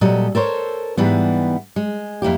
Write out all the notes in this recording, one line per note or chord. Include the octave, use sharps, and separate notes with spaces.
A#2 F#3 G3 A4 D#5
A4 A#4 C5 C#5
G#2 E3 G3 B3
G#3
F2 A#3 E4 G4